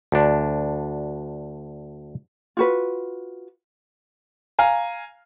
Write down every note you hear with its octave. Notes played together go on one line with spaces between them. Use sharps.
D2 D4
F4 F#4 B4
F5 G#5 A#5